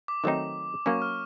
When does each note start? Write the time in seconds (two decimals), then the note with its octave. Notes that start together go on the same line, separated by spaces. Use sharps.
0.08 D6
0.24 D#3 F#3 A3 C4 D#4
0.86 F#3 A#3 C#4 C#6
1.02 F6